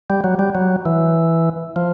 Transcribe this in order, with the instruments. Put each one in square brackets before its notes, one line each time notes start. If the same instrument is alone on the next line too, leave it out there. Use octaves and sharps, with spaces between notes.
[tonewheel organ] G3
F#3
G3
F#3
E3
F3